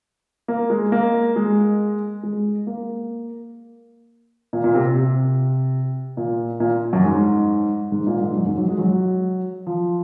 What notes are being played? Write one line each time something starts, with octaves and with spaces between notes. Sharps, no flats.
A#3
G#3
A#3
G#3
G#3
A#3
A#2
A#2
C3
C3
A#2
A#2
F#2
G#2
G#2
A#2
G#2
F#2
G#2
F#3
G#3
F#3
F3